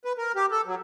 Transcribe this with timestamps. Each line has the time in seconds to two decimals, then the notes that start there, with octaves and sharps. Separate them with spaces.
0.05 B4
0.18 A#4
0.35 G4
0.51 A4
0.66 F#3